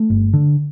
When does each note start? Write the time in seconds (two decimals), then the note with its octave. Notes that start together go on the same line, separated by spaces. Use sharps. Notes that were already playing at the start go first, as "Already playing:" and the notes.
Already playing: A3
0.10 G1
0.34 D3